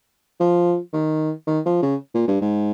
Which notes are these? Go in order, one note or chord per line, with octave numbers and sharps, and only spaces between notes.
F3
D#3
D#3
F3
C#3
A#2
G2
G#2